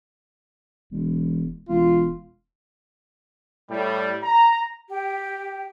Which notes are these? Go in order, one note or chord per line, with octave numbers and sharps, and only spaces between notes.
E1
E1 F4
A2 G3
A#5
G4 G5